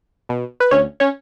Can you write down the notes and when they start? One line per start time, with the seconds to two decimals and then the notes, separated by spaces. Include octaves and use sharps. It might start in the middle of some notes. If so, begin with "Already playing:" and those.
0.29 B2
0.60 B4
0.71 D2 C#4 C#5
1.00 C#4 C#5